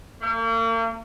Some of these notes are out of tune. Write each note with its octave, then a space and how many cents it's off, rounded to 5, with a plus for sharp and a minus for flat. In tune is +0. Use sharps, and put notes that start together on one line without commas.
A#3 -40